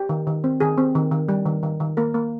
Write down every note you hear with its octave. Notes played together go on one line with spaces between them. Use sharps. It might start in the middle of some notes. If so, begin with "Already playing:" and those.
Already playing: G4
D#3
D#3
C4
D#3 G#4
C4
D#3
D#3
G3
D#3
D#3
D#3
A#3 A#4
A#3